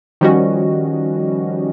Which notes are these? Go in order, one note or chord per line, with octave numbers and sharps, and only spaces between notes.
D#3 F3 G3 C#4 F#4 D#5